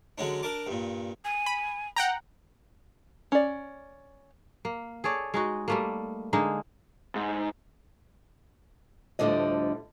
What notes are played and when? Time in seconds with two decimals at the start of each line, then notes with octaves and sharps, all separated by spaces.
0.18 D3 F#3 G#3 C#4 D4
0.43 D4 A#4 A5 D6
0.67 G2 A#2
1.25 G#5
1.46 B5
1.96 F#5 G5 A#5
3.32 C#4 D5
4.65 A#3
5.04 G#4 A4 C#5 D5
5.34 G#3 D#4 F#4
5.68 G3 A3 A#3
6.33 D3 G#3 A#3 D#4
7.15 G#2
9.19 D2 A2 D3 F3 G3 D#5